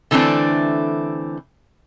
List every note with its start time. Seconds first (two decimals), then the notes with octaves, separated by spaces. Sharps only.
0.11 D3 E3 A3 C4 D4